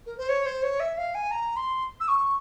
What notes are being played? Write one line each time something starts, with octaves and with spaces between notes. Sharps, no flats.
A#4
C5
C#5
C5
C#5
E5
F5
G#5
A#5
C6
E6
C#6